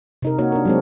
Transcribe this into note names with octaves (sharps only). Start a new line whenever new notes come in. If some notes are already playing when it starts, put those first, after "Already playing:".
C3 D#4 A#4
A#3 D#4 F#4 C#5
D4 A#4
F#3 G#3 C4